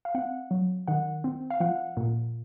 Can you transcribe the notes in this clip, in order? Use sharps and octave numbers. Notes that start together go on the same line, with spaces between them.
F5
C4 F#5
F#3
D#3 F#5
C4
F5
F3 F#5
A#2